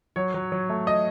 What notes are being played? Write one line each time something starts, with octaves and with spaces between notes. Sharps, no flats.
F#3 C#5
F#3
F#3
A3
D#5